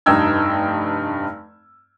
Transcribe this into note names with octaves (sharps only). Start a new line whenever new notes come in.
F1 G2 D#4 G5 E6 G#6